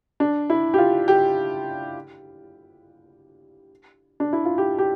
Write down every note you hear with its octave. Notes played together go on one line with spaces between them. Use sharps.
D4
E4
G4
F4
G4
D4
E4
F4
G4
G4